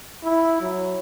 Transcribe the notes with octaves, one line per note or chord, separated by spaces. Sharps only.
E4
F#3